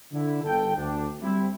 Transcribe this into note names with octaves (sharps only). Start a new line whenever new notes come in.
D3 E4
G1 A4 G5
D2 D4
G3 C4 E4